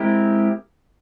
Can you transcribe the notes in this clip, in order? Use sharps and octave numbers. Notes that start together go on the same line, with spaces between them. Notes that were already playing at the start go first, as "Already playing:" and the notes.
Already playing: G#3 C4 E4 G4 A#4